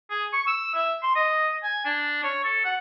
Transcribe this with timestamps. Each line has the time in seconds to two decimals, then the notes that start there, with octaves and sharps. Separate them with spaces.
0.10 G#4
0.33 C#6
0.47 E6
0.75 E5
1.03 C6
1.15 D#5
1.64 G#5
1.85 D4
2.23 C#5
2.44 A4
2.64 F#5